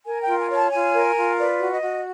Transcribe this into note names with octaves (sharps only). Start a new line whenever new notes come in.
A#4 G#5
G5
F4
G#5
C#5
A5
F4 G#5
A#4
F4
B4 D5
F#4
D#5
F#4